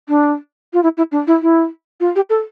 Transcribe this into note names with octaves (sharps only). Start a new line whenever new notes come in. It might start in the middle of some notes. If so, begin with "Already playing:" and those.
D4
F4
E4
E4
D4
E4
E4
F4
G4
A4